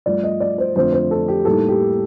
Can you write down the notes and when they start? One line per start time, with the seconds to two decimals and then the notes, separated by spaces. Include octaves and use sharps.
0.06 G2 F3 A3 D5
0.24 D#5
0.40 D5
0.58 C5
0.75 F2 D3 A3 C4 F4 C5
0.92 C5
1.11 A4
1.28 G4
1.45 A2 G3 A#3 D#4 A4
1.68 G4